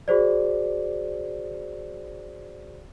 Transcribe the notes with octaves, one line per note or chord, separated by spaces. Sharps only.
F#4 G#4 C5 D5